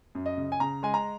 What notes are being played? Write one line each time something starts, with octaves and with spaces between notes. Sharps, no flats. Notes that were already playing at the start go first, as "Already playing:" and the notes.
F#2
D#5
C#3
G#5
C#3 A#5
G#3 G#5
A#5